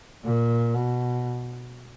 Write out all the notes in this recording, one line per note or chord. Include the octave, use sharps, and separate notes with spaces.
A#2
B2